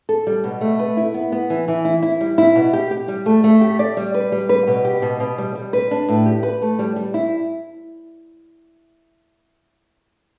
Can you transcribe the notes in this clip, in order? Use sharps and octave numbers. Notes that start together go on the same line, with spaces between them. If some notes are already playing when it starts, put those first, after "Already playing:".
A4
G3
B2
A3
B4
E4
B3
B3
E3
E3
E4
E4
G3
E4
B2
G4
G4
G3
A3
A3
G4
D5
G3
B4
G3
B4
B2
G4
B2
B2
G3
G3
B4
D4
A2
G4
B4
A3
G3
G3
E4